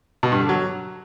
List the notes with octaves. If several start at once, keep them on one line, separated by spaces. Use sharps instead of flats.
B2
G2
D3
F#3